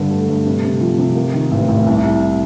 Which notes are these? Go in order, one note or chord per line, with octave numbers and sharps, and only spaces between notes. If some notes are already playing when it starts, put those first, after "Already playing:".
Already playing: G2 D3
A3
G2
C3
C3
F3
C3
A#3
D#3
A1
A1
C2
C2